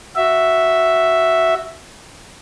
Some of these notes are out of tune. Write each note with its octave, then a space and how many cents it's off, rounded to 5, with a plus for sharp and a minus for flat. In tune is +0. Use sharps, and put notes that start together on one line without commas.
F#4 +0 E5 +0